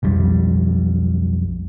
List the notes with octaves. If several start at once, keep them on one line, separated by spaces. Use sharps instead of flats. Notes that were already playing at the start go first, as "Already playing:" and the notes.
B1 F2 G3